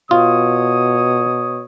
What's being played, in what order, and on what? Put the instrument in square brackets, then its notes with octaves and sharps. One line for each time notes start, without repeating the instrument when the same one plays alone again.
[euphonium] B2 [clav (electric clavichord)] F4 [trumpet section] C#5 D#6